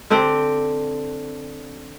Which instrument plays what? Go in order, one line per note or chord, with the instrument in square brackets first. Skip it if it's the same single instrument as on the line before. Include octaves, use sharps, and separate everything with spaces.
[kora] D3 C4 G4